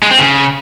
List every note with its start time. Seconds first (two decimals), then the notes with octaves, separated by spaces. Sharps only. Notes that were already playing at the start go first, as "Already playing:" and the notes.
0.03 G#3
0.11 C4
0.19 C#3